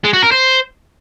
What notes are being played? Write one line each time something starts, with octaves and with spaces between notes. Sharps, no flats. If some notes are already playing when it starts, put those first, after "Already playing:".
G#3
F#4
A#4
C5